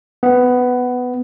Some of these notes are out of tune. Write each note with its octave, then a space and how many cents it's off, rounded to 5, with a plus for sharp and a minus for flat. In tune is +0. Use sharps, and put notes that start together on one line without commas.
B3 +10